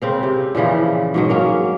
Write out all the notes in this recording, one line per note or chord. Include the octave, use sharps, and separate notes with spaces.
C#3 C4 A#4
C3
A#2 C#3 E3 F3
G#2 B2 F#3
A#3 C#4 A#4